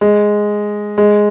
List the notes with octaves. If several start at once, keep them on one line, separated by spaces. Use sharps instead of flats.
G#3
G#3